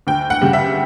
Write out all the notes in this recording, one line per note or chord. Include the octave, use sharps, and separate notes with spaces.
D2 G5
F#5
C#3 G3
E5